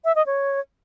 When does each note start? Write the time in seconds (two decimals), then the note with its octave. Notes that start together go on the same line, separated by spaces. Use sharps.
0.05 E5
0.15 D#5
0.26 C#5